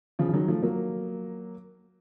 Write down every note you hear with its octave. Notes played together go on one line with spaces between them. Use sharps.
C#3 F3
F3
D#3 F#3
F3 A3
F#3 A#3